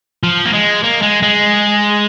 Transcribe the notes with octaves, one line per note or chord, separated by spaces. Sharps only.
F3
A#3
G#3
A#3
G#3
G#3